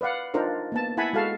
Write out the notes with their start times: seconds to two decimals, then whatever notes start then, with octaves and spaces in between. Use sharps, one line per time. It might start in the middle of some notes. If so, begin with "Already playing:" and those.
0.01 B4 D5 F5 F#5
0.34 D4 D#4 F4 A#4 C5
0.72 A#3 B3 A5
0.97 E4 F#5 G#5 A5 B5
1.13 G#3 F#4 A4 F5 A5